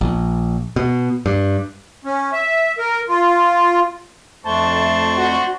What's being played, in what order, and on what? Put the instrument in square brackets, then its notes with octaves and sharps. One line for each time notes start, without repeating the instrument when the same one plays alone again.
[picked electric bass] A#1
B2
G2
[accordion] C#4
E5
A#4
F4
[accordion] F2 A3 [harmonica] D4 C5 C#6 [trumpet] A5
[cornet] F#4